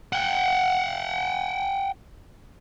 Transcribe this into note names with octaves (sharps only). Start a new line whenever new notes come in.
F#5 G5